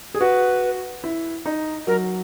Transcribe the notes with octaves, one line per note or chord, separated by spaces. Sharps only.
G#4
F#4 B4
E4
D#4
F#3 A#4